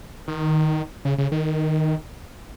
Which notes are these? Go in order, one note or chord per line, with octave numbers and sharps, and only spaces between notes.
D#3
C#3
C#3
D#3